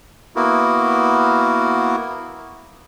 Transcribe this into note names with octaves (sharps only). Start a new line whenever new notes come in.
A#3 B3 E4 F#4 A#4